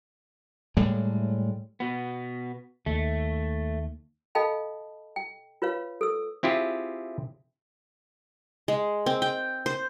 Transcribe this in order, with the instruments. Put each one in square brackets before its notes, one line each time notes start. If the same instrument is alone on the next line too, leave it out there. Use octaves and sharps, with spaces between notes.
[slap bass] A2 G3 G#3
[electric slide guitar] B2 B3
[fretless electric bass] D#2 [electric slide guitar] A3
[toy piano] A4 D#5 F5 G5 A5 B5
G5
F4 B4 C#5 F5
A4 E6
[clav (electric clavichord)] C4 E4 F4 G4 G#4
[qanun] G#3
C4
G5
C5